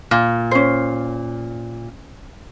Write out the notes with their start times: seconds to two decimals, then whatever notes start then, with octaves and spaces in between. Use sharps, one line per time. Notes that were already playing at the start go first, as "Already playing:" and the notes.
0.11 A#2
0.51 C#4 C5